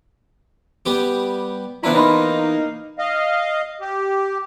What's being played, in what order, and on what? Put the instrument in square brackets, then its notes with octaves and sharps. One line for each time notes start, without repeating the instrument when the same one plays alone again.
[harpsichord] G3 B3 G4
[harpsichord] E3 B3 F4 [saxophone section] D4 E4 [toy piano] C5 A#5
[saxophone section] A#3 D#4 [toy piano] B4 B5 C6
[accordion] D#5 F5
G4